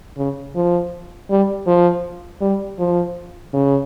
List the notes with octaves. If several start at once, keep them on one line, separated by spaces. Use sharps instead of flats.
C#3
F3
G3
F3
G3
F3
C#3